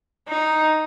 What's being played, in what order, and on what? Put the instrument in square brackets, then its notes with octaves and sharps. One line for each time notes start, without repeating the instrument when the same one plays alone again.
[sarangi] D#4